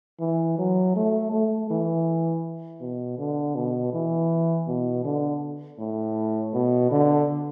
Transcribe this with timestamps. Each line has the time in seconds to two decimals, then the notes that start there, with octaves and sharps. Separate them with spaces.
0.20 E3
0.58 F#3
0.96 A3
1.32 A3
1.70 E3
2.81 B2
3.18 D3
3.55 B2
3.93 E3
4.68 B2
5.05 D3
5.79 A2
6.54 B2
6.91 D3